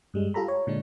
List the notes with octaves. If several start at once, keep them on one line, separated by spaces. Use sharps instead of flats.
G2 G3 G#3
F4 G4 A4 A#5 B5
C#5
A#2 D3 G#3 D4